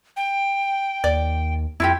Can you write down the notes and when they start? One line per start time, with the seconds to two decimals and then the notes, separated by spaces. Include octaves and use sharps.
0.17 G5
1.04 D#2 D5
1.80 F2 E4 F4 G4